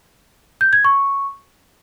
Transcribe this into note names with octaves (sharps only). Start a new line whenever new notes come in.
G6
G#6
C#6